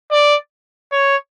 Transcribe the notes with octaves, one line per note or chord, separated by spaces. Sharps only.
D5
C#5